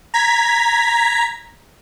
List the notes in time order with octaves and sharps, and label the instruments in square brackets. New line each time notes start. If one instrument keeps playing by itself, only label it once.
[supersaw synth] A#5 G#6 B6